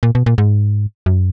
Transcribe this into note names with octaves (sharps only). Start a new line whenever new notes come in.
A#2
B2
A#2
G#2
F#2